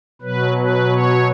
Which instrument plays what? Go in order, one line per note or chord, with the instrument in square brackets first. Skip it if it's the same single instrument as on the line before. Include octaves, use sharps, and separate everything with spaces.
[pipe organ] B2 F#3 B4
B4
C#5